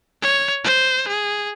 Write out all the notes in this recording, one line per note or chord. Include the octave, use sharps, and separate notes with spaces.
C#5
C5
G#4